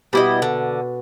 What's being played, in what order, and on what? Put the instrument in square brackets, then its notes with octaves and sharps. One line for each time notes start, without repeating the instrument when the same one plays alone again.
[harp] B2 B5 D6 [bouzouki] G3 E4 D#5
[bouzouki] D3